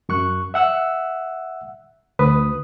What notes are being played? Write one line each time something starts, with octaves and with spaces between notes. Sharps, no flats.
F#2 C#6 F#6
E5 F#5 E6 F#6
D2 B4 D#6